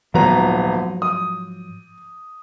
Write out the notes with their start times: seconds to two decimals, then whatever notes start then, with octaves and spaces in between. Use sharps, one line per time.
0.14 D#1 G#2 F3 F#3 B3 A#5
1.02 D#6